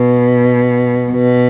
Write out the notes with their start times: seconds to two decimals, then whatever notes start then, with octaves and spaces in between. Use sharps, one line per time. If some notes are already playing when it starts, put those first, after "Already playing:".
Already playing: B2
1.13 B2